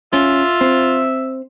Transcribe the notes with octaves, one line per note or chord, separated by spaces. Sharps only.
C#4 F4 E5
C4